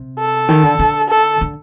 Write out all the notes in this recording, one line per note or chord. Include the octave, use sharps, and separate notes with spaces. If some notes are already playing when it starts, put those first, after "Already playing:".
Already playing: C3
A4
D#3
D3
D3
A4
D3